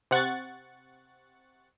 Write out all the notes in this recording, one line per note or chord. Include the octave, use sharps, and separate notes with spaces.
C3 F#5 C#6 A6